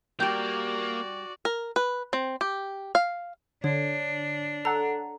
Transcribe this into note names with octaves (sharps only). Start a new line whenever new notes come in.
G3 A#3 F#4 G4 D5 G5
A#4
B4
C4
G4
F5
D3 D4 C#5
A4 F#5 A#5